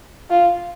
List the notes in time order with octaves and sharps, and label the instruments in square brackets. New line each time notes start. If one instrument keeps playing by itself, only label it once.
[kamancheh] F4